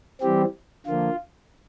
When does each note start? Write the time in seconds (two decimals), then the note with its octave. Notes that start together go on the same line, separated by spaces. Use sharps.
0.21 E3 G3 C4 G4
0.86 D3 F3 A#3 F4